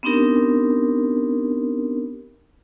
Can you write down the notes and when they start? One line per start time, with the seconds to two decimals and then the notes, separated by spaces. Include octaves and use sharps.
0.03 B3 C4 D4 D#4 G4 A#4